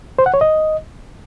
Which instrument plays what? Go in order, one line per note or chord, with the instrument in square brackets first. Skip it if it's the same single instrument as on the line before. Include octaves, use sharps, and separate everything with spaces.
[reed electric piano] C5
F#5
C#5
D#5